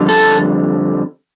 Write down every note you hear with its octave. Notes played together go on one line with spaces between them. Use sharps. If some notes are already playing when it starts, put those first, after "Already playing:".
Already playing: F2 D3 G3
A4